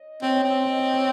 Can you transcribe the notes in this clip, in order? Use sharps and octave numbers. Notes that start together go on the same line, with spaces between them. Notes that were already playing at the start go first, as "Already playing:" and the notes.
Already playing: D#5
C4 C#5
D#5
C4
D#5
D#5
C#5